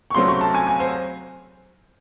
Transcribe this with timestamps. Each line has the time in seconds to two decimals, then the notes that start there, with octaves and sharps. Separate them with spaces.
0.10 C#6
0.14 C#2 C3 F#3 A3 C4 C6
0.28 C#6
0.41 A5
0.54 G#5
0.67 G#5
0.80 C5